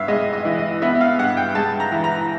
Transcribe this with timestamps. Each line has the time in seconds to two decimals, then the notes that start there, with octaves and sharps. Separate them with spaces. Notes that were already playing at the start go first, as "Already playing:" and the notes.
Already playing: G2 B3 E5 F5
0.08 G#3 D#5
0.33 D#5
0.45 E3
0.58 D#5
0.82 B3 E5
1.01 F5
1.18 G2 F#5
1.37 G5
1.55 G#3 A5
1.80 A#5
1.92 E3
2.04 A#5